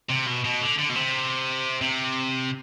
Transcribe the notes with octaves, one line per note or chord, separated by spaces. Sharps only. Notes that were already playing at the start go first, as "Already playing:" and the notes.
C3
B2
B2
D3
D3
B2
C3
C3